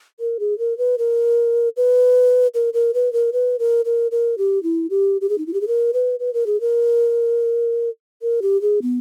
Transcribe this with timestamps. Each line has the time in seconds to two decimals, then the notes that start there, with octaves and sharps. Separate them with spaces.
0.20 A#4
0.39 G#4
0.58 A#4
0.78 B4
0.98 A#4
1.77 B4
2.54 A#4
2.74 A#4
2.94 B4
3.13 A#4
3.33 B4
3.59 A#4
3.85 A#4
4.11 A#4
4.38 G4
4.63 E4
4.90 G4
5.21 G4
5.29 G#4
5.38 D#4
5.46 E4
5.53 G4
5.61 G#4
5.67 A#4
5.93 B4
6.20 B4
6.34 A#4
6.46 G#4
6.61 A#4
8.22 A#4
8.42 G4
8.61 G#4
8.82 B3